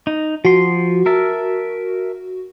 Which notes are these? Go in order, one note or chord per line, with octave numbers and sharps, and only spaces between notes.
D#4
F3 F#4 C6
A#4 E5 A5